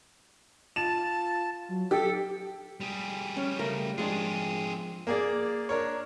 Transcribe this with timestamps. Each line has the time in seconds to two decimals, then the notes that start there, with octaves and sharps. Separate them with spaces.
0.76 F4 A5 E7
1.69 F#3
1.91 G4 A4 B6
2.81 G3 G#4
3.37 C#4
3.59 C#3 A3 A#4
3.98 F3 G#3 C4 D4 G#4
5.07 A#3 G#4 D5
5.69 D4 A#4 C#5